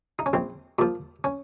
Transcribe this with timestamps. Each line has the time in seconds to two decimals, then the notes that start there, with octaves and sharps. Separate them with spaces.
0.19 D#4
0.26 C#4
0.33 A#1 C4
0.79 A#2 F3
1.24 C#4